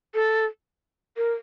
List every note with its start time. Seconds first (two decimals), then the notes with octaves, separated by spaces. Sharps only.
0.14 A4
1.17 A#4